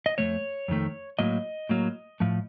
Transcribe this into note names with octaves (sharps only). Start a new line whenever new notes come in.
D#5
F2 D#3 A3 C#5
F2 D#3 A3
A2 F#3 A#3 D#5
A2 F#3 A#3
A2 F3 A3